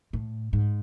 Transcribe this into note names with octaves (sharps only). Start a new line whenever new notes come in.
A2
G#2